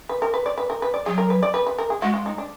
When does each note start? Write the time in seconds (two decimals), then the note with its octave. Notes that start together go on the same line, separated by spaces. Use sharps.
0.09 B4
0.22 A#4
0.34 B4
0.46 D5
0.58 B4
0.70 A#4
0.82 B4
0.94 D5
1.06 F#3 G#4
1.18 A#4
1.30 B4
1.43 D5
1.54 B4
1.67 B4
1.78 A#4
1.90 G#4
2.02 G#3 F#4
2.14 F4
2.26 D#4
2.38 D4